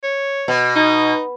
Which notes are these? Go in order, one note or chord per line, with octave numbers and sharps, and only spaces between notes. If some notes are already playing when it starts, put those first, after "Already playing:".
C#5
B2
D#4